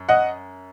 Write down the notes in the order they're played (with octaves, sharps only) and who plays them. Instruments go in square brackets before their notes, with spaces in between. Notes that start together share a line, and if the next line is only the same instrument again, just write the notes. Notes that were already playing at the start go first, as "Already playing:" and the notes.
Already playing: [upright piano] F#2
D#5 F#5